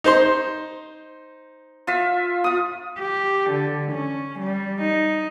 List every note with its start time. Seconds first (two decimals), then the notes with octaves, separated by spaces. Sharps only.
0.04 D#4 C5 C6
1.87 F4 E5
2.44 F4 D#6
2.99 G4
3.50 D3
3.92 C#4
4.40 G3
4.81 D#4